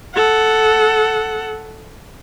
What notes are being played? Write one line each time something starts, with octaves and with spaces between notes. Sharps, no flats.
A4 F#5